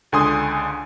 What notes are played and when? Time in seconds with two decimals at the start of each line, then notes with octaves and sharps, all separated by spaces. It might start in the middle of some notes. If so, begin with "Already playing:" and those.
0.12 C#2 D3 G#5 C6 D#6